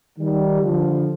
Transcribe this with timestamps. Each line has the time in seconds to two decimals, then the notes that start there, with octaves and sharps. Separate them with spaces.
0.18 D#3 G3
0.61 D3 F3